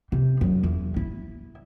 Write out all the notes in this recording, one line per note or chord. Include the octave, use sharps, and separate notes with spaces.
C3
F#2
E2
E4